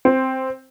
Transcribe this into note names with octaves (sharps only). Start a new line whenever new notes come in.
C4